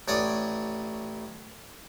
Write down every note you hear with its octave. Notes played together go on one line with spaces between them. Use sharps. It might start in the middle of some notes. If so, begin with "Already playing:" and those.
A1 C#5 D5 D#6